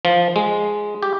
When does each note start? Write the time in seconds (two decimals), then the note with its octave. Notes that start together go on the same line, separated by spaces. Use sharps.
0.05 F3
0.36 G#3
1.02 G4